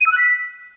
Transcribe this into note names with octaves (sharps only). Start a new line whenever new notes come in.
D#7
E6
F#6
B6